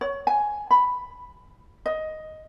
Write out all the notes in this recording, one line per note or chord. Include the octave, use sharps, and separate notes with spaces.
C#5
G#5
B5
D#5